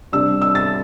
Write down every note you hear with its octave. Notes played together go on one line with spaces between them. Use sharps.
C3 G3 D4 E6
E6
A6